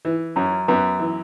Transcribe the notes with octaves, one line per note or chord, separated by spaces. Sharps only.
E3
F#2 C#4
F#2 B3
E3